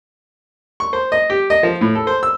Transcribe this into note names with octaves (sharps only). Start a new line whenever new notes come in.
C#6
C5
D#5
G4
D#5
F3
A2
A4
C5
E6